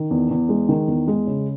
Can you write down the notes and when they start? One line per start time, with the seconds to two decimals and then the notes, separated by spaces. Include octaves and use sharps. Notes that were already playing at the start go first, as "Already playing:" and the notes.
Already playing: D#3
0.11 E2
0.31 E2
0.49 G#3
0.69 D#3
0.88 E2
1.08 G#3
1.27 C#3